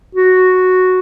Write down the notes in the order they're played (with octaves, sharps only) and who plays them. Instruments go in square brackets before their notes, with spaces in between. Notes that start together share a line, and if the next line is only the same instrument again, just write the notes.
[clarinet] F#4